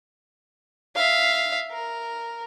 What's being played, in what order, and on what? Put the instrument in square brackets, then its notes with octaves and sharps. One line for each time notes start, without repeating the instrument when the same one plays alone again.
[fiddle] E5 F5
A#4